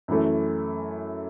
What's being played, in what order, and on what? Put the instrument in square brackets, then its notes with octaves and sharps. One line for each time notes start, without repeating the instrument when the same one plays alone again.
[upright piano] F#2 E3 A3